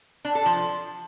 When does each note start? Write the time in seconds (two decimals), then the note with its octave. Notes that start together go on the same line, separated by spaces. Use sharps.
0.25 D4
0.35 A4
0.46 F3